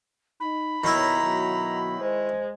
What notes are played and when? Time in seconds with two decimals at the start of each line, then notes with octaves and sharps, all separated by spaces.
0.40 D#4 B5
0.84 D#2 B2 D#3 E4 C#5 A#5
1.22 B2 F#3
2.00 G#3 C5